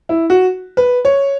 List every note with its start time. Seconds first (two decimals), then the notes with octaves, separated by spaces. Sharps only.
0.09 E4
0.30 F#4
0.77 B4
1.05 C#5